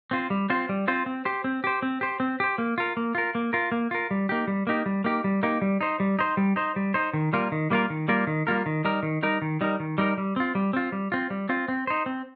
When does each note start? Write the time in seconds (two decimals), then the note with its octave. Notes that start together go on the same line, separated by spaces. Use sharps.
0.11 C4 F4 C5
0.30 G3
0.50 C4 F4 C5
0.69 G3
0.88 C4 F4 C5
1.06 C4
1.25 G4 C5
1.44 C4
1.64 G4 C5
1.82 C4
2.01 G4 C5
2.20 C4
2.40 G4 C5
2.58 A#3
2.78 F4 A#4
2.97 A#3
3.15 F4 A#4
3.35 A#3
3.53 F4 A#4
3.72 A#3
3.91 F4 A#4
4.11 G3
4.29 A#3 D#4 G4
4.48 G3
4.67 A#3 D#4 G4
4.86 G3
5.04 A#3 D#4 G4
5.24 G3
5.43 A#3 D#4 G4
5.62 G3
5.81 D#4 C5
6.00 G3
6.19 D#4 C5
6.37 G3
6.56 D#4 C5
6.76 G3
6.94 D#4 C5
7.13 D#3
7.33 G3 A#3 F4 A#4
7.52 D#3
7.70 G3 A#3 F4 A#4
7.90 D#3
8.08 G3 A#3 F4 A#4
8.27 D#3
8.47 G3 A#3 F4 A#4
8.66 D#3
8.85 G3 D#4 A#4
9.03 D#3
9.23 G3 D#4 A#4
9.42 D#3
9.61 G3 D#4 A#4
9.80 D#3
9.98 G3 D#4 A#4
10.18 G3
10.36 C4 F4
10.55 G3
10.73 C4 F4
10.92 G3
11.12 C4 F4
11.30 G3
11.49 C4 F4
11.68 C4
11.87 D#4 C5
12.06 C4